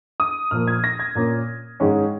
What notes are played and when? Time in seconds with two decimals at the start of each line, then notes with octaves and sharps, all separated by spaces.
0.20 D#6
0.51 A#2 F3 A#3 F6
0.67 G#6
0.84 A#6
0.99 G#6
1.15 A#2 A#3 C#4
1.80 G#2 D#3 G#3 C#4